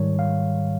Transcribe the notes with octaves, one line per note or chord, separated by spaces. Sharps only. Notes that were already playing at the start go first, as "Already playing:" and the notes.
Already playing: G#2 D#3 G3 C#5
F5